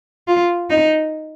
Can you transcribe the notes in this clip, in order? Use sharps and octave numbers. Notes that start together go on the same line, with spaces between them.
F4
D#4